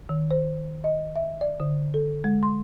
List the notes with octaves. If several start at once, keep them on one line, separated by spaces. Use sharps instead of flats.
D#3
C5
D#5
E5
D5
D3
A4
G#3
C6